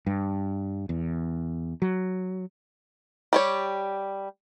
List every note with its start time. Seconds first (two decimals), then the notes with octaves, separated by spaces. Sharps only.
0.06 G2
0.89 E2
1.82 F#3
3.33 G3 G4 C#5